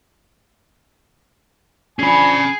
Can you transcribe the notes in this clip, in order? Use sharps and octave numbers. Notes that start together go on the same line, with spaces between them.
F3 C#4 D4 G#4 G#5 B5